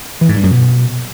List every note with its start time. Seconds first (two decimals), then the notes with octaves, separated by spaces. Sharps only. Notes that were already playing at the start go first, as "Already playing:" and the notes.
0.21 E3
0.29 G#2
0.36 G2
0.43 F#2
0.51 B2